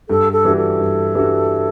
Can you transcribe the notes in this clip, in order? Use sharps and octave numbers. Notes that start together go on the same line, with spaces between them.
G2 A4
A4
E3 G3 D4 F#4
A4
G2
E3 G3 D4 F#4